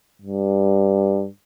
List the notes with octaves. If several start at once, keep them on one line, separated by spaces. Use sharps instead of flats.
G2